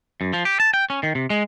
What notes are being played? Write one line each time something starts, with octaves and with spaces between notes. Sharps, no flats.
F#2
F3
G4
A5
G5
C#4
D#3
C3
G#3